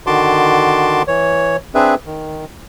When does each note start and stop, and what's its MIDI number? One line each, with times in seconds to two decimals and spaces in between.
0.07 1.02 50
0.07 1.02 51
0.07 1.02 66
0.07 1.02 81
0.07 1.02 84
0.07 1.02 86
1.08 1.57 52
1.08 1.57 73
1.75 1.95 60
1.75 1.95 62
1.75 1.95 68
1.75 1.95 71
1.75 1.95 76
2.06 2.45 51